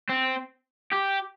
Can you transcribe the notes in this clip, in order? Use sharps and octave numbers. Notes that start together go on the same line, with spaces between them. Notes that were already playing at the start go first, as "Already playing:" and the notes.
C4
G4